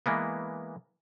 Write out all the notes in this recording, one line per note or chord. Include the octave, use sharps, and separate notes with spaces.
E3 G#3 A#3 B3